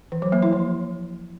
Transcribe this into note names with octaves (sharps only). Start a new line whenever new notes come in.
E3
F#3
A#3
E4
F3